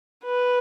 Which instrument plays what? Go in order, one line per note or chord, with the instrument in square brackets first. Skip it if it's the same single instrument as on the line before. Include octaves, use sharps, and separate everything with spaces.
[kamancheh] B4